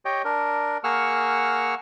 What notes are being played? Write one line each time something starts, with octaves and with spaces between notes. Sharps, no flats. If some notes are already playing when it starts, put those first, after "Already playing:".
G4 C#5 D#5 G5
D4 A#4
A#3 G#4 F#5 C#6 E6 F6